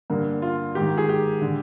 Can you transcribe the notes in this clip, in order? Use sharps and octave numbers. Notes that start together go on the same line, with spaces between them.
G2 D3 A#3
F4
G#2 D#3 G4
G#4
G4
D3